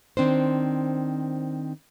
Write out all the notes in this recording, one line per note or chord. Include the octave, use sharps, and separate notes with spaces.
D#3 C4 D4 C5